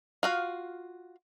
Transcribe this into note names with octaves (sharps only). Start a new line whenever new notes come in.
F4 F#4 F5